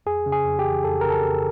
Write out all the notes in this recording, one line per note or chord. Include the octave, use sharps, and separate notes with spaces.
F2 G#4
C#3
G#4
F2
G4
E3
F2 A4
C#3 A#4
A4
F2